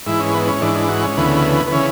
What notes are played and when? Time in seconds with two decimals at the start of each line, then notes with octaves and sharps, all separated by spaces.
0.06 G#2 E3 E4
0.20 C#4
0.34 B3
0.47 C#4
0.62 G#2 E3 D4
0.75 D4
0.89 F#4
1.03 C#4
1.17 D2 C#3 E3 B3
1.67 B3
1.72 C#3 E3 C#4